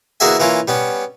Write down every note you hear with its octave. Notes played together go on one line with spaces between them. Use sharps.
E2 A#3 F#4 G#4 E5 G#5
E3 A#3 C#4 F4
G3 B3 C#4